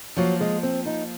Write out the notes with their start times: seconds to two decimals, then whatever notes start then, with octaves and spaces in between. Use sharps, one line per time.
0.16 F3 F#3 A#3 F4
0.41 G#3
0.63 C4
0.86 D#4